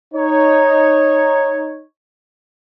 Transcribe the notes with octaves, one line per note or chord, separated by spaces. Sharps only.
D#4 C#5